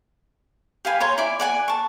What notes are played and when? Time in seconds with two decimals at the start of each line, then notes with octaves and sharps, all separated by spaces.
0.85 G4 F5 G#5 B5
1.00 C#5 A#5 C6
1.18 E4 D5 G#5
1.40 D5 F#5 G#5
1.68 A5 C#6